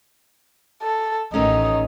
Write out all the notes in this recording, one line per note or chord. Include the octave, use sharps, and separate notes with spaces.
A4
A1 D#3 A3 C#4 D#4